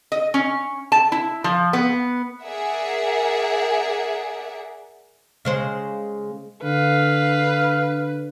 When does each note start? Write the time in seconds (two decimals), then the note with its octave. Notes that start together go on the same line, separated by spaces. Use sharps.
0.12 D#5
0.34 C#4
0.92 A5
1.12 E4
1.44 F3
1.73 B3
2.43 G#4 A#4 D5 E5 F#5
5.45 C#3 G#3 C5
6.63 D3 B4 F5